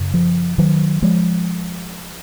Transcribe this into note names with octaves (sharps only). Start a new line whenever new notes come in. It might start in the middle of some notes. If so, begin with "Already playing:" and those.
Already playing: F#2 C#3
F3
D#3 F#3
F3 G#3